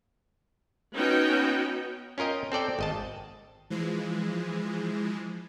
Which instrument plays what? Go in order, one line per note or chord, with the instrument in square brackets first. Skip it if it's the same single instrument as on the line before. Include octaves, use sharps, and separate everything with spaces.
[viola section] B3 C#4 D#4 F#4 G5
[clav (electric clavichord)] C#4 F4 A#4 D#5 G5
C4 A4 D5 G5
G#1 D#5 A5
[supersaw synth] E3 F3 G#3